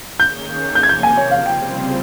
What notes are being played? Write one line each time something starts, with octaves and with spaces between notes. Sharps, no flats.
D#3 A#3 C#4 G#4 C#5 G6
C3 F3 A#3 G6
G#6
G6
G#5
C#5
C#3 G3 C4 F4 C5 F5
G5